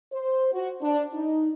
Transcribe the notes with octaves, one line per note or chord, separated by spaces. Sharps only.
C5
F#4
D4
D#4